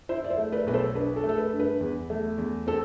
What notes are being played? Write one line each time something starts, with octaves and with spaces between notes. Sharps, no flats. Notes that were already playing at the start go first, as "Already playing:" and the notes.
E4 C5 E5
D5
C5 E5
A3
B4 D5
B1 B4
A4 C5
D4 B4
A4
A3
A4
B4
G2
B4
E2
A3
E2
C4 A4